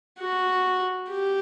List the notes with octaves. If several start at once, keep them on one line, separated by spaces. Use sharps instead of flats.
F#4
G4